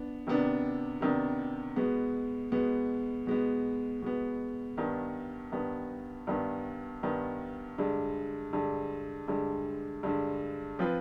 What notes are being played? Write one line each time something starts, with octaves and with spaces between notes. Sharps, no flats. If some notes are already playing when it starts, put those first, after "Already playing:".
Already playing: B3 D4
C3 D#3 B3 D4
C3 D#3 B3 D4
B2 G#3 B3
B2 G#3 B3
B2 G#3 B3
B2 G#3 B3
G2 D#3 B3
G2 D#3 B3
G2 D#3 B3
G2 D#3 B3
G2 D3 G#3
G2 D3 G#3
G2 D3 G#3
G2 D3 G#3
F3 C4 F4 B4